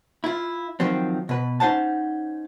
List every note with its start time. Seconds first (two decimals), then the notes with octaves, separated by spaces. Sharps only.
0.24 E4 F4
0.80 D#3 F3 F#3 C4
1.29 B2 B4
1.60 C#4 D#4 C5 F#5 A5